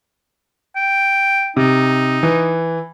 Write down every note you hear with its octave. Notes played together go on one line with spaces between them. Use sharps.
G5
C3 D#4
E3